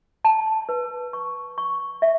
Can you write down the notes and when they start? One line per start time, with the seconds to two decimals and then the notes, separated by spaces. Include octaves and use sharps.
0.25 A5
0.69 B4
1.13 C#6
1.58 C#6
2.02 E5